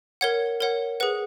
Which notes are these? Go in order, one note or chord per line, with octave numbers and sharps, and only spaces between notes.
A#4 C#5 F#5 G#6
A#4 C#5 F#5
G#4 B4 F#5